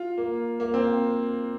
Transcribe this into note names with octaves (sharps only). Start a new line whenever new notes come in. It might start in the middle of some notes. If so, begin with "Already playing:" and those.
Already playing: F4
A#3
A#3
C4